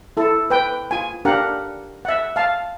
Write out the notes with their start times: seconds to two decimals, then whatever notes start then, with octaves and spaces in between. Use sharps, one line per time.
0.17 E4 A4
0.50 B4 G5
0.91 F4 G#5
1.25 D4 G4 A#4 F5 F#5
2.05 E5 F#5
2.36 F5 A5